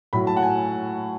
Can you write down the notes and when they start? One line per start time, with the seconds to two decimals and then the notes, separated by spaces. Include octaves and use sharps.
0.13 A2 F#3 B5
0.27 A5
0.37 F#5
0.43 G#5